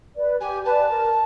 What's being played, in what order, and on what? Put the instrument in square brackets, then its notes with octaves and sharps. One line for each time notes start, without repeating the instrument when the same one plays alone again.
[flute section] B4 D5
[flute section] G4 [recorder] G#5
[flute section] B4 D5 [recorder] A5
[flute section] A#4